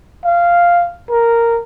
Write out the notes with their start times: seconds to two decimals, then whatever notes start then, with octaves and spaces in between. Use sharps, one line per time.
0.25 F5
1.10 A#4